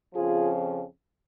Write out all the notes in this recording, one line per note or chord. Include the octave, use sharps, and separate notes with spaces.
F2 C#3 F3 F4 G#4